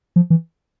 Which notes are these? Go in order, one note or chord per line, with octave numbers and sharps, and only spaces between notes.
F3
E3